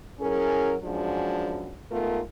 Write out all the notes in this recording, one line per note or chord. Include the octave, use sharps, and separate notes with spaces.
F#3 C#4 E4 G#4 A#4
F#2 F3 G#3 D4 F#4
G#2 A3 B3 F4 A#4